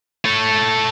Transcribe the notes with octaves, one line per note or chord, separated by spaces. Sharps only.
A4 C#5